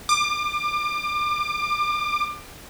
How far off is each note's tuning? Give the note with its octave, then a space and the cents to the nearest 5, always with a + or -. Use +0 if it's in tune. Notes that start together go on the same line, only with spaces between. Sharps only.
D6 +30